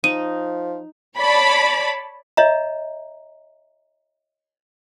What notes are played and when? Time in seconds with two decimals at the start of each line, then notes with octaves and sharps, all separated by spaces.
0.04 F3 D#4 D#7
1.17 C#5 D5 A5 B5
2.37 C#5 D#5 E5 A#5